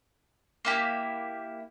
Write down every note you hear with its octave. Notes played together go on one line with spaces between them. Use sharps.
A#3 E4 G4